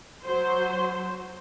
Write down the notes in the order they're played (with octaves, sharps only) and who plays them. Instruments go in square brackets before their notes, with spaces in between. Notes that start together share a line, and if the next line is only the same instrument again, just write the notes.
[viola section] F#3 C5